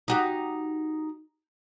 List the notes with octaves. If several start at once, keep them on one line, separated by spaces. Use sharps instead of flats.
D#4 F#4 G4